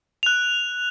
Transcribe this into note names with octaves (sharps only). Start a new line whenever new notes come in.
F#6 F7